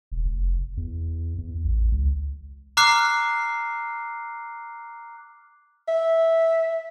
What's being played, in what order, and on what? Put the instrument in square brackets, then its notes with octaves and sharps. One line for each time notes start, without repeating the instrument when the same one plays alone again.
[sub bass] E1
F1
E2
E2
A1
C#2
[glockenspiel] A#5 D6 F6 F#6 C7
[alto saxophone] E5